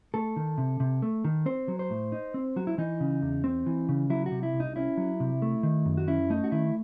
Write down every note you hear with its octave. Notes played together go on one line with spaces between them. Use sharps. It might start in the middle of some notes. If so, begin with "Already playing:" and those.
A3 A4
D#3
C3
C3
A3
D#3
C4 C5
F#3
C5
A2
D#4
C4
F#3 F#4
E4
E3 D#4
C#3
E2
C4
E3
C#3
F#3 E4
F#4
C3
E4
C2
D#4
C#4 E4
F#3
C3
A3
D#3
F#2
F#4
C#4 E4
A3 D#4
F#4
D#3 E4